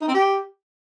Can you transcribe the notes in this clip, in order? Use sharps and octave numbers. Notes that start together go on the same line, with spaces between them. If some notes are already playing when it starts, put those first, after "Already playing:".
D#4
C4
G4